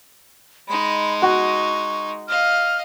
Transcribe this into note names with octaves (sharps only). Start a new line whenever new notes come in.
G#3 D#4 B5
F#4 C#6
D#5 F5 F6